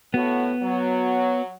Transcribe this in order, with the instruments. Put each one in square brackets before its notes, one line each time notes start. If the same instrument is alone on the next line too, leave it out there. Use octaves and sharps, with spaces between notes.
[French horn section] A2 F#4 [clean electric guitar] B3
[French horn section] F#3